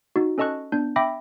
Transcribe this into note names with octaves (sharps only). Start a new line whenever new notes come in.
D#4 F#4
C#4 A4 D#5 A5 C#6 F#6
B3 D4 G6
E5 G5 B5 D6 A#6